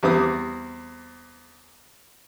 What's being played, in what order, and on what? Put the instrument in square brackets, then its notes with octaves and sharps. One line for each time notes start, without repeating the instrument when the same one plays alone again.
[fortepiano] E2 G3 C4 D6 D#6